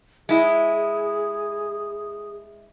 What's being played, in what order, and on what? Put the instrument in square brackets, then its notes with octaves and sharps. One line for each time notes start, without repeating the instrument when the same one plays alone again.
[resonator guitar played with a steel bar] G#3 E4 [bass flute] G#4